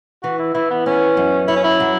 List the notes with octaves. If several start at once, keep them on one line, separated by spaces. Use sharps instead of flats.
E3 F#4
E4
E3 E4
B3
B3 C#4
F#2
E4 C#5
C#4
E4
F#3